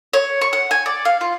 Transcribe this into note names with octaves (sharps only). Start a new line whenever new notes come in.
C#5
C#6
F#5
G#5
D5
F5
F4